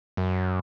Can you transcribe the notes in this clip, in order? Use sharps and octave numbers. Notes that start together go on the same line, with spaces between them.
F#2